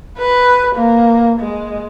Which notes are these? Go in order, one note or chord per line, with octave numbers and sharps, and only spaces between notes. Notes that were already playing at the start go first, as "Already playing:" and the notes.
B4
A#3
G#3